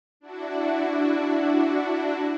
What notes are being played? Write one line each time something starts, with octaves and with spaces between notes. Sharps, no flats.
D4 E4 F#4